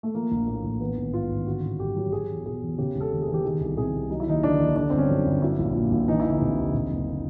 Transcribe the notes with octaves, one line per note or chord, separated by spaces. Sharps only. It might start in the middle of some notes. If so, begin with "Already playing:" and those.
A3
F3 A#3
A#1
A2 A#3
A#1
E3 B3
G#1
G#2 F4
G#1
D3 F#4
A1
G2 G4
F#3
F#3 G#4
E2
B2 G#4
E2
C#3 G4
E1
A4
D#2
G#4
E3
G4
D#3 G#4
C2
C3 G#4
C2
F#3 D#4
E4
D#2 D#4
D3 D4
D#2
D3 D4
G1 C4
C#4
F#2
D4
G1
F#3 E4
A#1
A#2
A#1
E3 D#4
E4
D2
D#4
C3
D2
C3
F#1